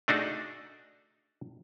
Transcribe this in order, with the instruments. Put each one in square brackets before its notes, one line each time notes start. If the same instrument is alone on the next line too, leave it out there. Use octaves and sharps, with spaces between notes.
[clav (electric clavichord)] A3 D4 D#4 F#4 G#4